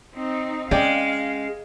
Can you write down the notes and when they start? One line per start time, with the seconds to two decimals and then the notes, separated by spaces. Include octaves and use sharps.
0.13 C4 D#4
0.71 G#3 C#4 D5 F5 G5